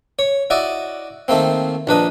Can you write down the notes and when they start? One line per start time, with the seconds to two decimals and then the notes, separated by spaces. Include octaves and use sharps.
0.19 C#5
0.50 E4 F#4 D5 D#5
1.28 D#3 A3 A#3 C4
1.87 A#1 D4 B4 D#5